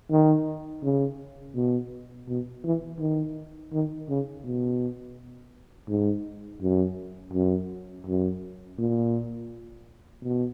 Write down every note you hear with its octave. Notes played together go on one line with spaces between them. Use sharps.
D#3
C#3
B2
B2
E3
D#3
D#3
C#3
B2
G#2
F#2
F#2
F#2
A#2
B2